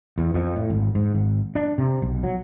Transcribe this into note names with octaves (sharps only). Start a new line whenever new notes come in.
E2
F2
A2
G#1
G#2
G#1
D4
C3
B1
F#3